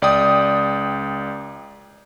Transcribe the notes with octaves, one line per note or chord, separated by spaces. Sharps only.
C#2 D5 G5 D#6